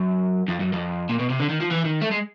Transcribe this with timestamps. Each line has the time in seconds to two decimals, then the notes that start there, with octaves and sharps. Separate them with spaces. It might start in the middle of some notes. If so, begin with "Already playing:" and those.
Already playing: F#2
0.48 F2
0.60 F#2
0.73 F2
1.09 A#2
1.19 B2
1.30 C3
1.40 D3
1.49 D#3
1.61 F3
1.71 E3
1.85 D#3
2.01 A3
2.11 G#3